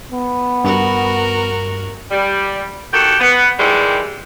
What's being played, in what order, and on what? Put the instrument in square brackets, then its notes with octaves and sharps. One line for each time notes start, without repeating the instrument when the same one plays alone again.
[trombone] B3
[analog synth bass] G2 [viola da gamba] F#4 A#4
[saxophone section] G3
D#3 F#4 G4 A4
B3
D#3 E3 G3 G#3